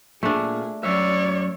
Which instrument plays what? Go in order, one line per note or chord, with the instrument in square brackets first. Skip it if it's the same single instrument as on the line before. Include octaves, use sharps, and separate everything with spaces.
[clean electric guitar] A#2 [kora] A3 D4 [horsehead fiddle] G#4
[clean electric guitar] F#2 E5 [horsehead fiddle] C#5 D5